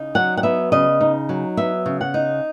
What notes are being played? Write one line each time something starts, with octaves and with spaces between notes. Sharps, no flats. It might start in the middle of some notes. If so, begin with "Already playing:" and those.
Already playing: C#3 D#4
F#3 F#5
F#5
B3 E5
C#3 D#5
D#4
F#3
B3 E5
C#3
F#5
D#4